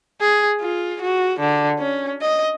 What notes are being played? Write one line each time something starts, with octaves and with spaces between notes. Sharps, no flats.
G#4
F4
F#4
D3
C#4
D#5